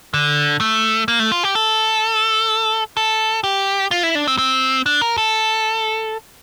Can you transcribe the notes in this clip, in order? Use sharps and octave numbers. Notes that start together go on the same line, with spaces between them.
D3
A3
A#3
A3
F4
G4
A4
A4
G4
F4
E4
D4
C4
C4
D4
A#4
A4